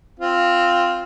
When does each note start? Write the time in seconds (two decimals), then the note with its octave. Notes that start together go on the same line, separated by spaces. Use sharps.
0.20 C4 F4